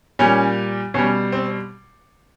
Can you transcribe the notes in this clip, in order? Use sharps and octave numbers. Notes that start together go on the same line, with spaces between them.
A#2 G3 C#4
B2 G3 C#4
C4